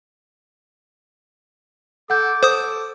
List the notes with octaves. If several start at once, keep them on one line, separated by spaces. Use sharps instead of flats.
A4 F#5 D6 G6
A4 C5 D#6